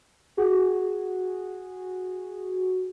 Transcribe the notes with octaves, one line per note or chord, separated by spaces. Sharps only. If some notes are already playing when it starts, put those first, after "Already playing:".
F#4 G#4